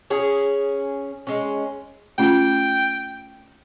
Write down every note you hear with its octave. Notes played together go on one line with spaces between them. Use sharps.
C#4 G#4
G#3 C#4
A3 C#4 F4 G5